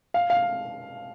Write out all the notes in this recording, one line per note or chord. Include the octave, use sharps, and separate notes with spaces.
F5
F5